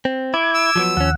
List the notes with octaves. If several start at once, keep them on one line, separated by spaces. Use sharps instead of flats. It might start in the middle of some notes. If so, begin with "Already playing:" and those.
C4
E4 D6 G#6
E6
F3 F#3 B3
D#2 F3 C#4 F#5